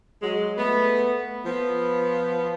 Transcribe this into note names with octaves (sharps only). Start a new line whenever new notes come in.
F#3 G#3
A3 B3
F3 B3